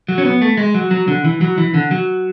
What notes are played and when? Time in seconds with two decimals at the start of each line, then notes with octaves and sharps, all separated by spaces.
0.08 F#3
0.18 C#4
0.25 B3
0.42 A3
0.57 G#3
0.74 F#3
0.91 F#3
1.08 D3
1.25 E3
1.41 F#3
1.58 E3
1.74 D3
1.91 F#3